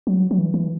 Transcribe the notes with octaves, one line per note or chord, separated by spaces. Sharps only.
F#3
F#3
E3
E3